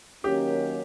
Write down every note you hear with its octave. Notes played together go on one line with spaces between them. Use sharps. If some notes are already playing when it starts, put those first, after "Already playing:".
D#3 F#3 A#3 C#4 G4